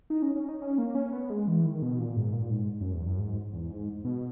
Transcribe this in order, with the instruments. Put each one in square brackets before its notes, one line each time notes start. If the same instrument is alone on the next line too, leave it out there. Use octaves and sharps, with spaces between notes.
[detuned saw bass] D#4
C#4
C#4
D#4
C#4
A#3
C#4
B3
G#3
E3
D#3
B2
A#2
G#2
A#2
G#2
F#2
E2
F#2
G#2
E2
G#2
B2